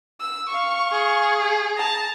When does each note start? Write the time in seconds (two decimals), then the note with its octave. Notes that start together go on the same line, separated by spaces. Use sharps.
0.20 E6
0.49 F5 C#6
0.92 G#4
1.76 A5 A#5